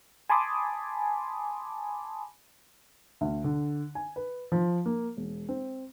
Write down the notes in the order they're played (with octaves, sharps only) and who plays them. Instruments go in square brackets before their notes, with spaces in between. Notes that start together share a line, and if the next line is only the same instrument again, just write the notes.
[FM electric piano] G#5 A5 B5 C6 D6 D#6
[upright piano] D2
D3
G#5
B4
F3
A#3
E1
C4